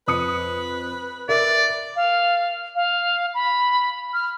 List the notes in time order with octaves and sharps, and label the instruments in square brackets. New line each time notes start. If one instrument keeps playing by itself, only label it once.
[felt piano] F2 D#6 C#7 [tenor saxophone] B4
[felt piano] A#4 E5 [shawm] D5
[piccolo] F5
F5
B5
F6